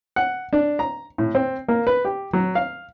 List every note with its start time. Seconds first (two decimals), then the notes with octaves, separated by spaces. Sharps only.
0.16 F#5
0.53 D4
0.79 A#5
1.18 A2
1.35 C4
1.68 A#3
1.87 B4
2.05 G4
2.33 F#3
2.55 F5